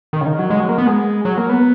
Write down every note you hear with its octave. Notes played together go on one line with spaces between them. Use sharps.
D#3
C#3
D#3
F#3
G#3
F#3
A#3
B3
G#3
F#3
A#3
B3